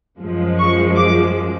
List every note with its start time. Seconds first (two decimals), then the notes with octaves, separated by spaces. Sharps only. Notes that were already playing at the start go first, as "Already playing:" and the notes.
0.20 F#2 F3 G#3
0.59 C#6
0.96 D6